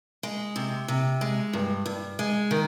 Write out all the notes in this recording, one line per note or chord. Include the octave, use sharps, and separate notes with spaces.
G#3
C3
C3
G#3
G2
G2
G#3
D#3